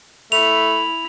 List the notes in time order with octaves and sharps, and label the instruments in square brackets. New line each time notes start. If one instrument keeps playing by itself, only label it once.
[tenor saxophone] A3 [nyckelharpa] E4 B5 [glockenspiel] F7